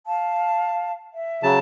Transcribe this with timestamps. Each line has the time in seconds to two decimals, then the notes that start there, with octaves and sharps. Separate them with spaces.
0.06 F5 A5
1.13 E5
1.43 C#3 F#3 A5